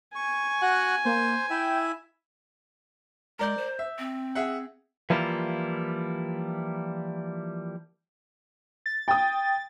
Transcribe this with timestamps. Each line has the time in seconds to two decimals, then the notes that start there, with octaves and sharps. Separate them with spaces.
0.15 G#5 C#6
0.62 F#4 F#5
1.05 A#3 C5
1.50 E4 E5 G5
3.39 G#3 A#4 D5 G6
3.57 C5
3.79 E5
3.99 C4
4.35 G#4 E5 F#5
5.10 E3 F3 G3 A#3 E4 F4
8.86 A6
9.08 G5 D#6 A6